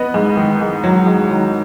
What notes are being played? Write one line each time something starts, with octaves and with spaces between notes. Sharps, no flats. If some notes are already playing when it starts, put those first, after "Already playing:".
Already playing: B3 B4 D#5
G#2
D#3
G#2
F#3
G#2
D#3